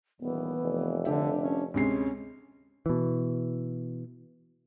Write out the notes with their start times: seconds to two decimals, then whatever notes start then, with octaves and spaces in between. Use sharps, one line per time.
0.21 D#1 E3 B3
0.61 F1
1.05 D3 D4 G4 E5
1.44 C#4
1.74 D2 C3 G#3 C#4 C7
2.86 B2 E3